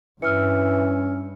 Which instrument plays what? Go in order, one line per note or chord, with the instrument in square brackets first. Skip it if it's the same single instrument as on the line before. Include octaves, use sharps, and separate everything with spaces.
[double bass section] G2 [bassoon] E3 [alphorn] C#4 [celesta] E6 F6 C#7